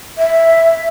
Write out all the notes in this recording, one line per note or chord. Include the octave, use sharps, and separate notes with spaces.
E5